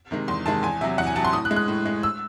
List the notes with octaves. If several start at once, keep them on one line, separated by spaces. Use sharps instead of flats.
C3 D#3 G#3
E2 C6
C3 D#3 G#3 A5
E2 G#5
C3 F#3 E5
E2 F#5
G#5
C3 F#3 A5
C6
A2 D#6
F#6
G#3
F#6
A2
G#3
E6